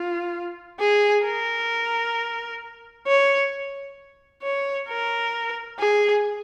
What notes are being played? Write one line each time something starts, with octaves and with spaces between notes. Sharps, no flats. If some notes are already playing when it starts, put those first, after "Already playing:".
Already playing: F4
G#4
A#4
C#5
C#5
A#4
G#4